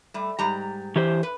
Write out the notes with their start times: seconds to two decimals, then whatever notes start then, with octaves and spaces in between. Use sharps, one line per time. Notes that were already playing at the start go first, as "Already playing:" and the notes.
0.14 G3 A3
0.39 G#2 G3 A#5
0.96 E3 G4 C5
1.23 B4